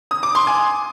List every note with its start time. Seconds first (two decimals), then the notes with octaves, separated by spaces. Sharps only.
0.11 D#6
0.23 D6
0.35 C6
0.47 G#5